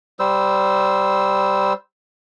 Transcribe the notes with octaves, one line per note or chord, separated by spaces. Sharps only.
G3 C5 E6